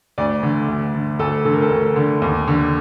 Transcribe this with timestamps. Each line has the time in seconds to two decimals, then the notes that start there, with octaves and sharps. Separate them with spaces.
0.18 D2 D5
0.43 D3
0.69 D2
0.94 D3
1.19 D2 A4
1.45 D3 A4
1.54 A#4
1.62 A4
1.70 D2
1.96 D3
2.22 D#2
2.48 D3